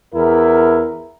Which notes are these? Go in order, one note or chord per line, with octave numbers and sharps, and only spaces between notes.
E2 E4 A#4